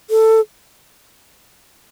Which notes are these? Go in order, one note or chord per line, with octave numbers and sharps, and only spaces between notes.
A4